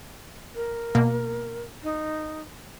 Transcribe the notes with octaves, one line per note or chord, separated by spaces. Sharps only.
A#4
B2 A#3
D#4